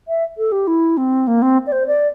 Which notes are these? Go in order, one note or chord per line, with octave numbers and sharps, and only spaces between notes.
E5
A4
G4
E4
C4
A#3
C4
D5
C5
D5